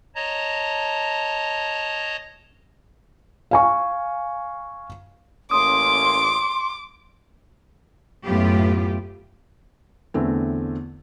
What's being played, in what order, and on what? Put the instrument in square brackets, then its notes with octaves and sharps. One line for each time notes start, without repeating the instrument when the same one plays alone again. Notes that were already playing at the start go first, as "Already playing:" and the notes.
[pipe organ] C#5 D#5 A5 A#5
[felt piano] F5 G#5 C#6
[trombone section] A1 A#3 C#4 [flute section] C6 [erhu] D6 [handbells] D#6
[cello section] F#2 A2 B3 E4 F4 G4
[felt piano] E2 D3 A3 C4